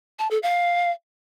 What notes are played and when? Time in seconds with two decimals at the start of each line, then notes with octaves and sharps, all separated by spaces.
0.19 A5
0.31 A4
0.43 F5